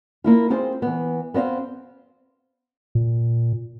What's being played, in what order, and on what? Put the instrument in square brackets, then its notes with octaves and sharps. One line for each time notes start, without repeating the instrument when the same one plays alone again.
[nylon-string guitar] A#3 E4 F4
C4 F4 G#4 C5
E3 B3
B3 C4 D#5 F5
[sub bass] A#2